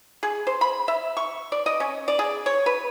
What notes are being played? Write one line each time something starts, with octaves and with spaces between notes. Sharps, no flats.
G#4
C5
B5
E5
C#6
D5
D#5
C#4
D5
G#4
C#5
B4